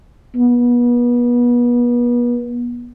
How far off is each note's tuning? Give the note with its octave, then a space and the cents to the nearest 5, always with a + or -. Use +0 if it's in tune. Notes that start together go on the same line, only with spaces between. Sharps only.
B3 -35